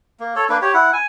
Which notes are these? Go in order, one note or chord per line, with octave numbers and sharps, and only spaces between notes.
A#3
A4 C#5
A#3 D4 B4
G4 C#5
E4 F#5
G#5